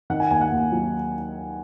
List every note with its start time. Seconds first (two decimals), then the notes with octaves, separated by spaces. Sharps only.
0.10 D#3 F#5
0.20 G#5
0.31 D#2 G#5
0.41 F#5
0.52 D#2
0.72 F#3